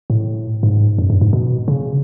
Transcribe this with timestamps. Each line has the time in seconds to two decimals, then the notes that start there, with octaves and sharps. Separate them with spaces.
0.10 A2
0.63 G#2
0.98 F#2
1.10 G2
1.21 G#2
1.33 B2
1.68 C#3